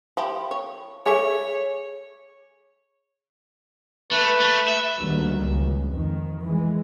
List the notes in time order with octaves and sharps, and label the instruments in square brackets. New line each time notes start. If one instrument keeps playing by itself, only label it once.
[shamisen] F3 E4 G4
C#5
[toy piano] G#4 [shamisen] A4 E5 G#5 [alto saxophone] C#5
[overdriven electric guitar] A3 [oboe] B4
[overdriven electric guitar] A3
E5
[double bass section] D2 D#3 F#3 G3 A#3
C#2
F2 D#3
E3 G#3